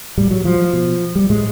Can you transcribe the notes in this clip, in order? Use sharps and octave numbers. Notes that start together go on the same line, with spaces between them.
A2 G3
F#3
F3
B2
G3
A2 G#3